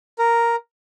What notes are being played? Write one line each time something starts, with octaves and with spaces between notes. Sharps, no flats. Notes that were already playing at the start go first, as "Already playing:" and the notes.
A#4